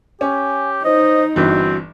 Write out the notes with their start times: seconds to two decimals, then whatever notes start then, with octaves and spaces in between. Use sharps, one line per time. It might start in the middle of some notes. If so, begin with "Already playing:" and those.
0.21 C#4 G4 G#5
0.85 D#4 C5 D#5
1.36 G1 G2 E3 C4 F#4